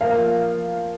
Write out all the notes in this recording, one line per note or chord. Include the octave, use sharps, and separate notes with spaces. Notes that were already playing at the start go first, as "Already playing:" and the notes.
F3 A#3 F4 A#4 F5